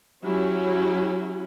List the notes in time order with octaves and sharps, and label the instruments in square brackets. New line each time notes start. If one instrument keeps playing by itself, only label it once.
[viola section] F#3 C#4 E4 F#4 G4